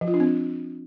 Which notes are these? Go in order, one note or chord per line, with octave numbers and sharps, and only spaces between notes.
F3
F4
D4
C4